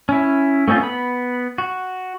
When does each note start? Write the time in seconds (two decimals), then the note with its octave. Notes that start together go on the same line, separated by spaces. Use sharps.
0.09 C#4 E4
0.68 A3 C4 C#4 D#4 F4
0.80 B3 B5
1.58 F#4